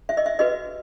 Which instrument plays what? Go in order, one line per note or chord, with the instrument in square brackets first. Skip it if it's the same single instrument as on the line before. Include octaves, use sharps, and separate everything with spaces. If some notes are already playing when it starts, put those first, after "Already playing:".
[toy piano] E5
D#5
E5
F#4 B4 D#5